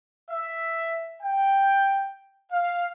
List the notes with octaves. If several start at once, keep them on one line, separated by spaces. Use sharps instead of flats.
E5
G5
F5